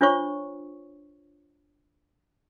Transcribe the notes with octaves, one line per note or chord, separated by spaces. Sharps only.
D4 F4 C5 C#5 C#6